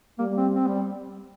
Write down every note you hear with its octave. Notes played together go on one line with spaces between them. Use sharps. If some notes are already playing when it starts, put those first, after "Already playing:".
G3 A#3
C4
C4
G3